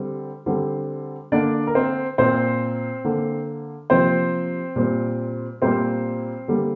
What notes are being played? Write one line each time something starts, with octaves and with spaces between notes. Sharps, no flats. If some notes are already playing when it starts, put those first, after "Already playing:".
Already playing: D3 G3 C4
D3 G3 C4
D3 A#3 D4 D5
A#4
C4 C5
A#2 A#3 C4 C5
D3 A#3
C3 F3 A#3 C4 C5
A#2 G3 C4
A#2 G3 A#3 C4 C5
D3 G3 A#3